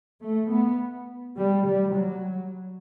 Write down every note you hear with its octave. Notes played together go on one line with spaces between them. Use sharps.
A3
B3
G3
G3
F#3